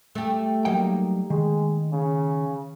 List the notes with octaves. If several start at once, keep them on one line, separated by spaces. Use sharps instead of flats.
A3 G4
F#3 G3 A#3 D#4 G5
D#3 G#3
C#3